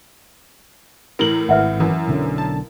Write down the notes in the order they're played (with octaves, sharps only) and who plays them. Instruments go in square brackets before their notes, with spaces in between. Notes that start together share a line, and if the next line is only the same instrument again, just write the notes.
[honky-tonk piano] A2 E3 F#7 [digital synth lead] A#4
[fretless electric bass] G#1 [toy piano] B4 E5 F#5
[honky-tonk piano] F#2 [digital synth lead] E3 [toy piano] E4
[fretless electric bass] B1 D3 C#4
[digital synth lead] A5